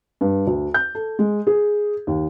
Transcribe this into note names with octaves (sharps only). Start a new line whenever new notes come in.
G2
D2
G6
A4
G#3
G#4
D#2